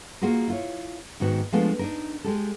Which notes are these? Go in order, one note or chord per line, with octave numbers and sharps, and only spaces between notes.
A#3 F4 F#4 G#4 A#4
E4 F4 C#5
G#2 D#3 B3 F#4
F3 G#3 A3 B3 D4 F4
D4 D#4 A#4
G#3 G4 A4